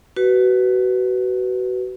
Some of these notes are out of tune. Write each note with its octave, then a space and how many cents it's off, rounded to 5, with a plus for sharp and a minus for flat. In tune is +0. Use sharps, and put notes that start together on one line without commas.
F#4 +25 B4 +0